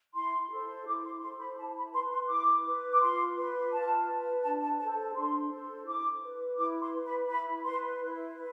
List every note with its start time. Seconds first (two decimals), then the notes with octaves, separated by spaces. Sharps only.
0.15 E4 C6
0.51 A4 C5
0.86 E4 D6
1.04 C6
1.22 A4 C5 C6
1.40 B5
1.58 E4 A5
1.76 B5
1.93 B4 C6
2.12 C6
2.29 E4 D6
2.65 B4
2.93 D6
3.01 F4 C6
3.36 B4
3.72 F4 A5
4.08 B4
4.43 D4 A5
4.61 A5
4.79 A4 C5 A5
5.15 D4 C6
5.50 A4 C5
5.86 E4 D6
6.22 B4
6.58 E4 D6
6.81 C6
6.93 B4
7.05 B5
7.29 E4 B5
7.65 B4 C6
8.00 E4
8.36 B4